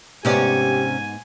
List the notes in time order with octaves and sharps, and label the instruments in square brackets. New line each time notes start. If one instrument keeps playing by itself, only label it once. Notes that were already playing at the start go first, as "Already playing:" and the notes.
[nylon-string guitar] G#2 B3 [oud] C3 C#4 D5 [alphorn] G4 [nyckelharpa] G#5